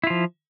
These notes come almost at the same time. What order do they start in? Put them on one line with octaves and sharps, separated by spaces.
E4 F4 F3